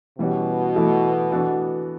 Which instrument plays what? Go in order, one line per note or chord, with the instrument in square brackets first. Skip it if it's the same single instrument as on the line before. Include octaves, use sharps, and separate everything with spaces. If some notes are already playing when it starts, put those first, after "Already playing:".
[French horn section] B2 [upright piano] E3 G3 C#4 F#4
[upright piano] E3 A3 E4 A4
E3 B3 D4 F#4 A4